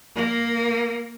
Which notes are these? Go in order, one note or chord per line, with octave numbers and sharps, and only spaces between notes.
A#3